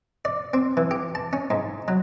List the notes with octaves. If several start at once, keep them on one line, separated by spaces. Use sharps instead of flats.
D5
C4
E3
G4
A5
C#4
G#2
F#3